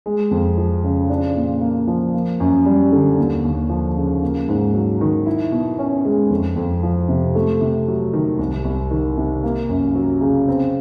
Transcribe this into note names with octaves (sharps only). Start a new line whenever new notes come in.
G#3
F2
F3
C#3
D4
A#2
A#3
F3
A#3
F#2
G3
D3
D#2
D#2
F3
C#3
A#3
G#2
F#3
D#3
E4
B2
C#4
G#3
F2
F2
F3
C3
A3
C3
F#3
D#3
C2
C2
D#3
C3
A#3
F#2
F#3
C#3
C4